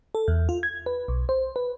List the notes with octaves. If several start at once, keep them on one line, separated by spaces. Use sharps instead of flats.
A4
E2
F4
G#6
B4
B1
C5
B4